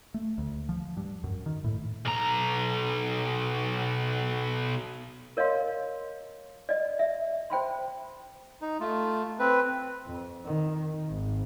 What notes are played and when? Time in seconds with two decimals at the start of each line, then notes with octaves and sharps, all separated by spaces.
0.14 A3
0.38 D2
0.69 F3
0.97 G2
1.24 F#2
1.46 D#3
1.64 A2
2.05 B1 A#5
5.37 A#4 C#5 D#5 F5 C6
6.69 D5 D#5
6.99 E5
7.50 C5 G5 B5 C6
8.62 D#4
8.80 A3 F4
9.39 C4 B4
10.06 F2
10.45 D#3
11.10 G#1